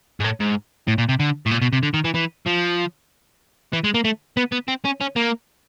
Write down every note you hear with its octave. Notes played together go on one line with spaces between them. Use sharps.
G#2
A2
G#2
A2
A#2
C3
D3
A2
A#2
B2
C3
D3
D#3
E3
E3
F3
E3
G#3
A#3
A3
B3
B3
C4
C#4
C#4
A#3